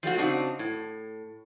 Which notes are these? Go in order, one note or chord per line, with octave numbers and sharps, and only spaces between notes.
F3 G3 A3 F#4
C#3 C4 D4 D#4 F#4
A2